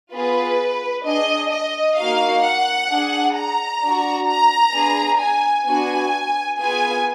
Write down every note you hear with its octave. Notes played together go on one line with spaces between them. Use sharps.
B3 F4 G#4 B4
D4 G#4 D#5
D#5
A#3 D#4 F#4 F5
F#5
D4 G#4
A#5
D4 F#4
A#5
B3 D4 G#4
G#5
B3 D4 F#4 G#5
B3 F4 G#4 G#5